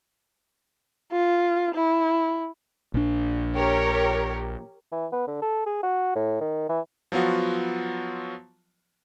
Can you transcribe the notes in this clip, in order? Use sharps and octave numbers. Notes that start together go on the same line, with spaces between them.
F4
E4
A#1 D4
G4 A#4 C#5
E3
B3
D3
A4
G#4
F#4
A2
D#3
E3
F3 F#3 B3 F4 F#4